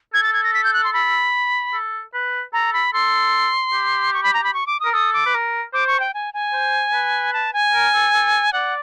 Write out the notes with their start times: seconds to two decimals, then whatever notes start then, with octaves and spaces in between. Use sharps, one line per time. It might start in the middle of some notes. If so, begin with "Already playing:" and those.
0.14 A4 G#6
0.24 A6
0.33 G#6
0.44 A#6
0.54 B6
0.64 G6
0.74 F#6
0.84 C6
0.93 B5
1.73 A4
2.14 B4
2.53 A4 A#5
2.73 B5
2.93 A4 C6
3.73 G4
4.13 C#6
4.23 B5
4.34 A#5
4.44 B5
4.54 C#6
4.67 D6
4.80 D#6
4.85 A#4
4.93 A4 D#6
5.13 D6
5.26 B4
5.34 A#4
5.73 C5 D6
5.87 C#6
6.00 G5
6.14 G#5
6.34 G#5
6.53 C5
6.93 B4
7.33 A5
7.53 G#5
7.74 A#4
7.94 A4
8.13 A4
8.53 D5 F#5